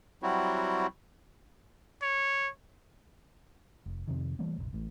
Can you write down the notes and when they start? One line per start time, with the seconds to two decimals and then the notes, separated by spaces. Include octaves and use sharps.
0.23 F#3 G3 C4 E4 F#4
2.02 C#5
3.86 F1
4.08 F2 C3 D#3
4.39 E3 G3 A3 A#3
4.56 F1 A#1
4.73 A1 A2